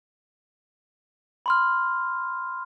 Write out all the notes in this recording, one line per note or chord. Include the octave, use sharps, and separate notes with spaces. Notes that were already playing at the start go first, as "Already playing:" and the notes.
B5 C6 F6